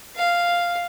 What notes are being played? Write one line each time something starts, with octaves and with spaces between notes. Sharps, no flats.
F5